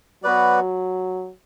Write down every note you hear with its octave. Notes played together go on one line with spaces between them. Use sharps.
F#3 B3 F#4 B4 D5